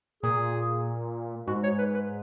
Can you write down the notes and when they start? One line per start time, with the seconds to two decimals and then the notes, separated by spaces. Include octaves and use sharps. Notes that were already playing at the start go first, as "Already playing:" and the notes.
0.23 A#2 G#4
1.47 G#2 F#4
1.63 C#5
1.78 B4
1.94 B4